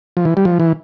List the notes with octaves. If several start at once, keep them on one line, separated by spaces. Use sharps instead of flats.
F3
E3
G3
F3
E3